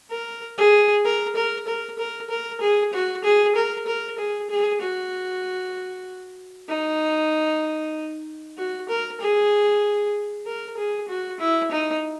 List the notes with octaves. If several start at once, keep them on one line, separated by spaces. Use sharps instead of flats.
A#4
G#4
A#4
A#4
A#4
A#4
A#4
G#4
F#4
G#4
A#4
A#4
G#4
G#4
F#4
D#4
F#4
A#4
G#4
A#4
G#4
F#4
E4
D#4